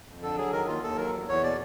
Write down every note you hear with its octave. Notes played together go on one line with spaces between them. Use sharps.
F2
D3 A4
F#3 G#4
D#3 A#4
D#2 F4
D#2 A4
F#3 A#4
E2
E2 C#5
B2 D5